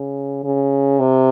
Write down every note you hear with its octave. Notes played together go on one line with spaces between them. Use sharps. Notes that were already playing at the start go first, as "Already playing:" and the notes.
Already playing: C#3
C#3
C3